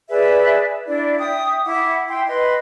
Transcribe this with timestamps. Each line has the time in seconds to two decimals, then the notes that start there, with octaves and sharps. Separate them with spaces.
0.09 G#4 B4 D5 E5
0.86 D4 E4 D5
1.19 E5 G5 D#6
1.64 E4 F#5 D6
2.08 E4 G5 C6
2.27 B4 D#5 C6